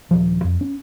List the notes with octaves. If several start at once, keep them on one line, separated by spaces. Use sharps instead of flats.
D#1 F3
F2
C#4